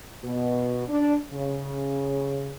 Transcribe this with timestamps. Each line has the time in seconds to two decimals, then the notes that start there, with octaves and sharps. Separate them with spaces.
0.23 B2
0.88 D4
1.31 C#3